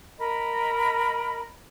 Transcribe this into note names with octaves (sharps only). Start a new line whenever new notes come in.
A#4 D#5 B5